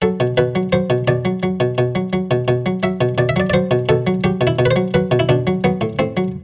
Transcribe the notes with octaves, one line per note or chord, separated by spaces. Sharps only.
F#3 A4
B2
B2 B4
F#3
F#3 C5
B2
B2 D5
F#3
F#3
B2
B2
F#3
F#3
B2
B2
F#3
F#3 E5
B2
B2 D5
E5
F#3 D5
D5
F#3 C5
B2
B2 A4
F#3
F#3 G4
B2
E4
B2
B4
C5
F#3
F#3 B4
B2
E4
B2 D4
F#3
F#3 B3
A2
A2 C4
F#3